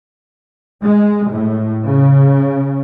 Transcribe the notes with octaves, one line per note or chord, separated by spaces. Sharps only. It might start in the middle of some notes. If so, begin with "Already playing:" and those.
G#3
A2
C#3